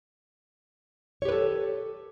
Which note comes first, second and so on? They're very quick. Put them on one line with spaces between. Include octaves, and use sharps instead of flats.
C#5 G4 B4 A4